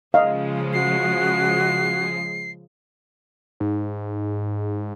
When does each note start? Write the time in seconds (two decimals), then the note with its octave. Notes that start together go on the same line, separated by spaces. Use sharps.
0.14 C#3 F3 G#3 D#5 F5
0.73 F#4 C7
3.60 G#2